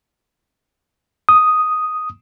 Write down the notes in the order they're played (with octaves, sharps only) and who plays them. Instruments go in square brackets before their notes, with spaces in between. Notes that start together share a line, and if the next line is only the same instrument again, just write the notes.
[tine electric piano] D#6